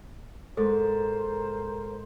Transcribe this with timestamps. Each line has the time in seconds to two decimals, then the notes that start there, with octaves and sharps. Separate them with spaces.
0.57 G#2 A4 A#4 C5